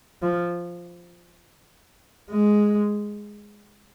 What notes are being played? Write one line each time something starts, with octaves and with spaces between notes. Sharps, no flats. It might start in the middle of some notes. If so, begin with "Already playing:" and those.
F3
G#3